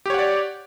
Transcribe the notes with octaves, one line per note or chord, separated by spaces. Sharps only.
G4 C#5 D5 F#5